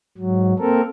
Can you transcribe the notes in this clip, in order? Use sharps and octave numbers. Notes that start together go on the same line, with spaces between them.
G#2 F#3
A#3 C4 A4 A#4